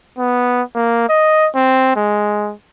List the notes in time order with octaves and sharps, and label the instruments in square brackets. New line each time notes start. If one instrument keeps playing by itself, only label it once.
[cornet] B3
A#3
D#5
C4
G#3